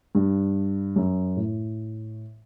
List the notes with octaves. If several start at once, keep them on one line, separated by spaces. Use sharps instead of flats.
G2
F#2
A2